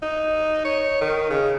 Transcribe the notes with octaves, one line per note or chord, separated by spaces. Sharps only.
D#4
C#5
D#3
C#3